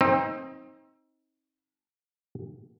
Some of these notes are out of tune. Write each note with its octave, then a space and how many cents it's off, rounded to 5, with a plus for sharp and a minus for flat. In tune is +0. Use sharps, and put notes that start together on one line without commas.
C4 +30 D#4 +20